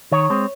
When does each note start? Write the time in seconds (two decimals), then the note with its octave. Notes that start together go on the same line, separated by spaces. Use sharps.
0.12 D#3 C#5
0.30 G#3 C4